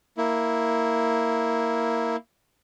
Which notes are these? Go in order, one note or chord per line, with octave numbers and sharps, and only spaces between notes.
A#3 E4